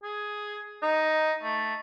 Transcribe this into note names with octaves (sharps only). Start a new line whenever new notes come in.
G#4
D#4
A3